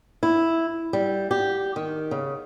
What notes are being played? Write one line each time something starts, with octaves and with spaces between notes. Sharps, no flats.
E4
G3
G4
D#3
C#3